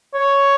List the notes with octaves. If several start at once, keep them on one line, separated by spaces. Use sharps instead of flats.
C#5